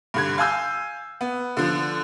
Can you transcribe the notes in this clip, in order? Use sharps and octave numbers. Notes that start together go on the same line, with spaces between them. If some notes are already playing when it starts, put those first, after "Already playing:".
G2 D3 G#6
F5 G#5 E6 G6
B3
D3 F3